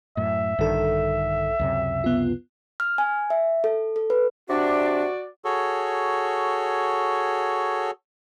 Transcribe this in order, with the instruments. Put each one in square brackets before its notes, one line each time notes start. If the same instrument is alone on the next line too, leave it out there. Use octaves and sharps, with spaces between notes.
[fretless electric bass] F#2 A2 [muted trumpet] E5
[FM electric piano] A#1 A4 [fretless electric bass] G2 D3 D#3
[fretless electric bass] C#2 F#2 C3
[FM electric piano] B3 F4
[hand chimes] F6
G#5
E5
A4
A4
B4
[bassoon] C3 [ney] D4 [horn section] F#4 D5
[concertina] F#4 G#4 A4 C#5